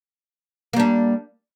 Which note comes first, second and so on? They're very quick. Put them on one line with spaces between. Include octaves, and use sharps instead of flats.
A#3 G3 D4